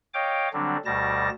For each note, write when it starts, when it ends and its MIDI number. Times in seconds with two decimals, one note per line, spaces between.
0.14 0.49 73
0.14 0.49 75
0.14 0.49 77
0.14 0.49 79
0.14 0.49 86
0.53 0.77 50
0.53 0.77 54
0.53 0.77 55
0.53 0.77 60
0.53 0.77 62
0.85 1.29 38
0.85 1.29 47
0.85 1.29 55
0.85 1.29 81
0.85 1.29 94